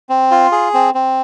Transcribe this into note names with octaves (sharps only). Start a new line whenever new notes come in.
C4
F4
G#4
C4
C4